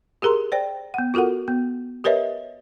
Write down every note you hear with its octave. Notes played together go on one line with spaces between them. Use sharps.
G4 G#4 A#4 A#5 C6
C5 D5 G5
B3 F#5
F4 F#4 A4 A#4 F#5
B3
G4 A#4 B4 C#5 D#5 E5